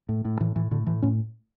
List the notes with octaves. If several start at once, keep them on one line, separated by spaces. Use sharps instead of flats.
A2
A2
A2 E3
A2 E3
A2 D3
A2 E3
A2 C#4